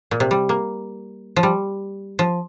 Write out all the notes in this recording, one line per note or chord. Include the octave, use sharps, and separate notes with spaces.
A#2
C3
G3
A#3
F3
G3
F3